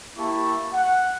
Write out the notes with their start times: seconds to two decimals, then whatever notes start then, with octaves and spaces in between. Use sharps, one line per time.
0.18 A#3 E4 G4 A5 C#6
0.73 F#5